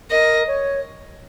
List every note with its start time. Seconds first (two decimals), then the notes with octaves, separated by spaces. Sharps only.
0.10 A#4 D#5
0.47 C#5